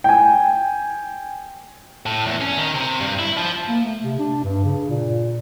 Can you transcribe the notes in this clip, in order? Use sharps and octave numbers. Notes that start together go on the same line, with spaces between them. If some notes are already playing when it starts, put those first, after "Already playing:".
G5 G#5
A2
E2
C#4
D#3
C3
G2
E4
F3
A#3
A3
C3
D4
G2
C#3
A#2